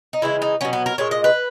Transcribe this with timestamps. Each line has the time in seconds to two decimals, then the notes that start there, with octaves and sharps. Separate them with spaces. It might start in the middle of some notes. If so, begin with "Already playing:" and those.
0.13 D#4
0.22 C#3 E3 G#3 E4
0.42 D#4
0.61 B2 F#3 C#4
0.73 B3
0.86 A#4
0.98 A#2 G#3 C#5
1.11 D#5
1.24 B4